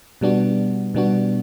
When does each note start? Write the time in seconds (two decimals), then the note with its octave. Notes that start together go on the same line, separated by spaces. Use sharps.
0.21 B2 G3 B3 D4 F#4
0.94 B2 G3 B3 D4 F#4